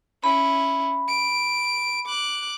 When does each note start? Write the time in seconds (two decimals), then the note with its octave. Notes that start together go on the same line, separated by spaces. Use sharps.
0.24 C#4 E4 B5
1.08 D7
2.06 D6 F#6